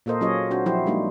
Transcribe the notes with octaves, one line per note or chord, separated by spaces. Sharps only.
A#2 A#3 A4 A#4 C5 D#5
F#3 C#4 F4 G#4 C#5 D#5
C4 D4 F#4 C5
F3 F#3 E4 F#4 G4 C5
G3 G#3 A#3 D4 D#4